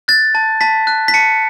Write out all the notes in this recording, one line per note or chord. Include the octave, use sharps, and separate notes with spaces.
F#6 A6
A5
A5 B6
F#6
B6
A5 C#7